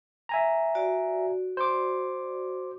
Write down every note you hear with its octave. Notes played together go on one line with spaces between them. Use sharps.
E5 G#5 A#5
F#4 D5
C5 D6